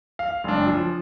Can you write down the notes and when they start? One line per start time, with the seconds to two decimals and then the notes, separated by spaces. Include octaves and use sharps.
0.19 F5
0.44 F#1 G#3 D4 C6
0.66 F3